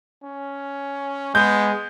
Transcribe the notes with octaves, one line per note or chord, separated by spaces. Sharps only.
C#4
G#3 B3 G6